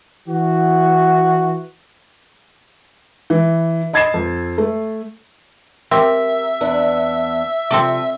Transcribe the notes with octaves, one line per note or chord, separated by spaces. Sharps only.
E3 F#4
E3
D#5 B5 G#6 A6 C7 E7
F2
A3
C4 G4 A#4 E5
E2 B3 D4
C3 F3 C4 A4 D5